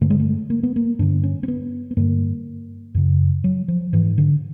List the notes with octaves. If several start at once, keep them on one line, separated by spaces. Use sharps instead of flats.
G2 D3 A3
G#3
A3
A#3
B3
A#3
G2 D3 D4
C#4
C4
B3
B3
G2 D3 A#3
F#2 C#3
F#3
F3
G#2 E3
D3